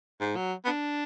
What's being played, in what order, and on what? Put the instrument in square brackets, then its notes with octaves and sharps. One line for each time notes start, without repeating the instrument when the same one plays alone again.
[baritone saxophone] G#2
F#3
B3
D4